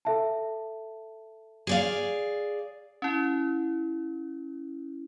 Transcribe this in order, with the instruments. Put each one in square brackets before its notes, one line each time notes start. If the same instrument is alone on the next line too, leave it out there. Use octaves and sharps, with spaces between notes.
[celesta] A4 E5 A5
[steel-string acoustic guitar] G#4 D5 F5
[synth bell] C#4 E4